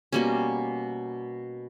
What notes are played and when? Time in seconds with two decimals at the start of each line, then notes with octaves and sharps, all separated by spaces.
0.12 B2 G3 A#3 C#4